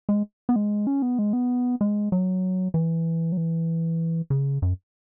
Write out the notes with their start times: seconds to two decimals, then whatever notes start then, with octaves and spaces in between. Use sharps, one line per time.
0.09 G#3
0.49 B3
0.56 G#3
0.87 C#4
1.02 B3
1.19 G#3
1.33 B3
1.81 G#3
2.12 F#3
2.74 E3
3.32 F#3
3.37 E3
4.30 C#3
4.62 F#2